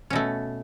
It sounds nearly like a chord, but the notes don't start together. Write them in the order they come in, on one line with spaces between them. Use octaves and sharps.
C#4 B2 A3